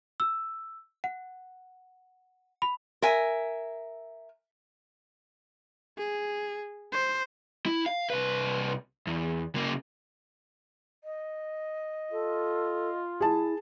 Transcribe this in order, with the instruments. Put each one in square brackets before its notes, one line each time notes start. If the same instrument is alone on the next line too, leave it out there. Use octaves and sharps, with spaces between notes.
[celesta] E6
F#5
B5
[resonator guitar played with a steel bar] A#4 E5 G#5
[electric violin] G#4
C5
[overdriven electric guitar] E4
F5
C2 B4
E2
C#3 A#3
[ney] D#5
[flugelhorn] F4 [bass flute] A4
[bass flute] E4 [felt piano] G#4 A5